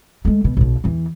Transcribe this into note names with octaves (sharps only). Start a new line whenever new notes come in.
G#3 A3
B2
B1 B2
E2 E3